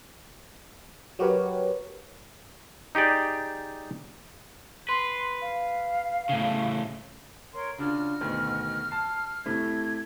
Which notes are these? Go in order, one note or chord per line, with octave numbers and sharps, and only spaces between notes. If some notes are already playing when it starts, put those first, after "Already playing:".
F#3 F#4 G4 A#4 B4 C#5
D#4 G4 G#4 D5
B4 C6
F5
A2 C#3
A#4 C#5 C6
C#3 D4 F4 F#4 F6
D2 B2 D#3
A5 C7
A2 C3 A3 G#6